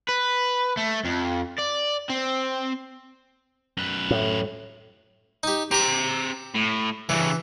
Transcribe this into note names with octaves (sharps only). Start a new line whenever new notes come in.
B4
A3
F2
D5
C4
F#2 B4
A2
D#4 G4
C4 G4 A#5 D6
A2
G2 C#3 E3